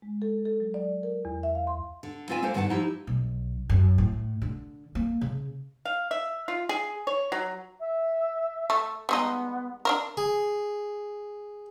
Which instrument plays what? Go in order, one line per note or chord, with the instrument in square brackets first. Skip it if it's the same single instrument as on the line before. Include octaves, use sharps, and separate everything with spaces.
[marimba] G#3
A4
A4
F#3
D5
A#4
E2
E5
F5
C6
[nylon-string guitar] D3
C4 F4 D5 E5 G#5
A#3 D4 A4 C5
G2 D3 D#3 D#4 F#5 A5
F3 D#4 E4 G4
[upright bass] B1
F#2
A2
D3
A#3
C#3
[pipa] F5
E5
F4
G#4
C#5
F#3
[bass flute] E5
[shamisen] A3
[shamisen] G3 G#3 D#4 [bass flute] B3
[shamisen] D4 E4 A#4
[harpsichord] G#4